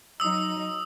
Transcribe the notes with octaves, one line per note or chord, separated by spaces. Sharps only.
F#3 D#4 D#6 E6